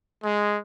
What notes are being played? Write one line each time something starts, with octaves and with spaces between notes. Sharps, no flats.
G#3